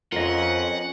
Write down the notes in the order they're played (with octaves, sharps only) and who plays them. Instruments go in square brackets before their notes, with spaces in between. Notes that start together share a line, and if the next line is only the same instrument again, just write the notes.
[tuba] F2 [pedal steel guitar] C#4 A#4 [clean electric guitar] F4 D#5 [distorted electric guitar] F#5